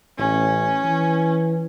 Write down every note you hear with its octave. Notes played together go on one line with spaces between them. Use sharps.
A1 C#4
E3